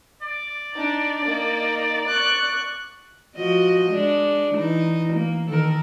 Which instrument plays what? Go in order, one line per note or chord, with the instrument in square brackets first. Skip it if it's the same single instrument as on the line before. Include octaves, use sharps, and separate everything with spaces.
[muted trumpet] D5
[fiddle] D4 D#4
A#3 D#4
C#6 F#6
[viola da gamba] F3 F#4 D#5
G#3 D4
E3 D#4
A#3
D#3 A4 A#4